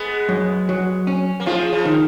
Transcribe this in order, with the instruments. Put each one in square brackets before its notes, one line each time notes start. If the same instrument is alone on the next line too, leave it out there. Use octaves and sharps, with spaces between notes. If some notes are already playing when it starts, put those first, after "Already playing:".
Already playing: [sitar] G#3 B3
[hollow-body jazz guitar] F#2
F#3
C#4
[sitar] A#3
[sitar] F3 G#3 [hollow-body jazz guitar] F4
[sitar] C#3 F3
[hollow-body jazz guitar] D#3